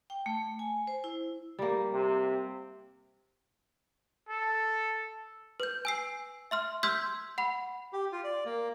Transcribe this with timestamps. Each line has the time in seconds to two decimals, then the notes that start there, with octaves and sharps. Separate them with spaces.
0.10 G5
0.26 A3
0.59 G#5
0.87 C5
1.04 E4
1.59 G3 A#3
1.93 C3
4.29 A4
5.60 B4 G6
5.85 G#5 E6 C7
6.51 E5 C6 F6
6.83 C6 E6 F6 G6 G#6 B6
7.38 F#5 B5
7.93 G4
8.12 F4
8.24 D5
8.45 A#3